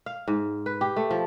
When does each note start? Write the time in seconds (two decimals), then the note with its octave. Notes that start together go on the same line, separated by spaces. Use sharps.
0.06 F5
0.28 G#2
0.66 B4
0.81 G4
0.96 A3
1.11 F3